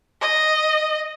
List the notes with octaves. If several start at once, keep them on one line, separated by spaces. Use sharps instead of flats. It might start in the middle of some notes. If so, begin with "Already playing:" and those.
D#5